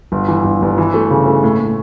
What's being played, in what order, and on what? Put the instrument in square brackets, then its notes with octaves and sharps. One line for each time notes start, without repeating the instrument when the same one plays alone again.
[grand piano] G1
E3
G1
G1
E3
A3
C#3
A3
A2
A2